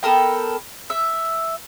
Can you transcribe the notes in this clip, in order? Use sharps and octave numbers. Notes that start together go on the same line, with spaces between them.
B3 A4 A#4 G5
E5